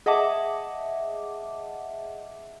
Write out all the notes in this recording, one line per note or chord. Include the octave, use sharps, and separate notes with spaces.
G#4 D#5 E5 F#5 A5 D6